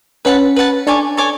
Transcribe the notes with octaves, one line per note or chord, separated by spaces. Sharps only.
C#4 B4 F#5 A5
B4 F#5 A5
D4 A4 C#5 G#5 D6
A4 C#5 G#5 D6